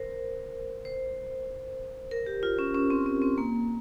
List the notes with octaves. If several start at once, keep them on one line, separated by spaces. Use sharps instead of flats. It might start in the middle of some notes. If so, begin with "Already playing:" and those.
Already playing: A#4 C5
C5
A#4
G4
F4
C#4
C#4
C4
C4
C4
A#3